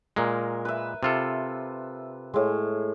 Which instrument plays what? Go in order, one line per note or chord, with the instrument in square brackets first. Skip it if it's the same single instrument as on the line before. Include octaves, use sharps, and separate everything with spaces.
[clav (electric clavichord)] A#2 G#3 [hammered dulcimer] A#4
[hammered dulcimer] B4 E5
[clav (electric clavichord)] C3 F4 A4
[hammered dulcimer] A2 G#3